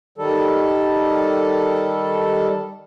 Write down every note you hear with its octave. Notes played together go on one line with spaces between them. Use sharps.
D#3 G3 A4